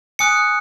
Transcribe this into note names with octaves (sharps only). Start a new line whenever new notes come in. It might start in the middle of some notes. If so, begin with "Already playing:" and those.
G#5 D#6 F#6 C#7